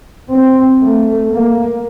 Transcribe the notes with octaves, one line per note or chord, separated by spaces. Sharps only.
C4
A3
A#3